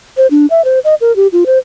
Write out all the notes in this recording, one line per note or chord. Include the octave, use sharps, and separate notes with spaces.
C5
D4
E5
C5
D#5
A#4
G4
F4
C5